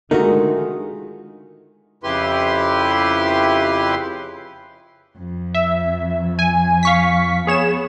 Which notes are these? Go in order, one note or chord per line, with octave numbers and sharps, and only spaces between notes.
D3 D#3 G#3 A3 D#4 F4 F#4 A#4
F2 C#3 E4 G4 B4 C6
F2
E5
G#5
F5 C#6 B6
B3 G#4 C#5 E7